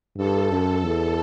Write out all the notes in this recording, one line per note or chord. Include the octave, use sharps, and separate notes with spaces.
G2 A4
F#2
E2